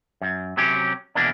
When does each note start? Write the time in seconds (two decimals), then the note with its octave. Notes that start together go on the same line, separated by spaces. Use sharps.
0.21 F#2
0.57 C3 F#3 C#4 G4
1.15 E2 B2 E3 A#3 D4